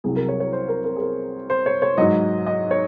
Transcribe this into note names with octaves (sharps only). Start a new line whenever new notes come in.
C2 C3 F#3 G#4
A#4
C#5
C#5
C5
A#4
A#4
G#4
A#4
C5
C#5
C#5
G#2 F#3 D#5
D#5
C#5